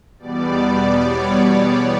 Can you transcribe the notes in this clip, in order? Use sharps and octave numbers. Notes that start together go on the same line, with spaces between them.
E2 B2 G3 B3 D5
C#5